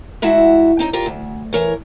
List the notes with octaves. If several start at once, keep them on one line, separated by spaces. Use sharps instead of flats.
E2 G#3 E4 F#4 E5 F#5
C4 D#4 C#5
F4 G4 A#4 D5
D2
E3 A#4 C#5